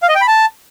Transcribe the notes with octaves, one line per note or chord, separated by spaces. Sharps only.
F5
D#5
G5
B5
A5